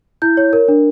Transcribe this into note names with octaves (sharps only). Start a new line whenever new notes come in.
E4 G6
C#5
A#4
D4